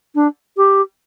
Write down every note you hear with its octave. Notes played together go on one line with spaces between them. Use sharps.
D4
G4